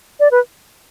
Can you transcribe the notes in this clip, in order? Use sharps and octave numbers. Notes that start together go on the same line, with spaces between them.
D5
B4